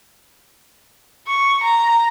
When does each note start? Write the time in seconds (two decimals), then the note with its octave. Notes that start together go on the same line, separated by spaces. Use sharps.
1.27 C#6
1.63 A#5